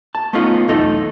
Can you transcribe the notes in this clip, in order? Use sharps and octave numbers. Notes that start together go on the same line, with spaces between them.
A5
A3 B3 C#4 D#4 F4 A4
B1 E2 A3 D#4 A4